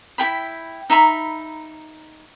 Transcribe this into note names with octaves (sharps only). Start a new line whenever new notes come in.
E4 G#4 G5 B5
D#4 E5 A#5 B5